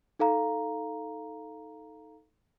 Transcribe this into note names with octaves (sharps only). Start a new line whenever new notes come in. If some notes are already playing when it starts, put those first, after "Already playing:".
D#4 A4 F5 A#5